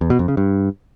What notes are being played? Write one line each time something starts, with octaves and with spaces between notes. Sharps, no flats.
E2
B2
F2
C#3
G2